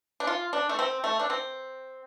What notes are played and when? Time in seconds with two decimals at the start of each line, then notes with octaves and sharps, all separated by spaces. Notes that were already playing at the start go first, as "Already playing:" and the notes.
0.20 D4
0.27 F4
0.53 D4
0.69 A3
0.79 C4
1.04 A3
1.19 D4
1.30 C4